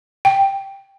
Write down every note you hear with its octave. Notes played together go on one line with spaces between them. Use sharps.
G5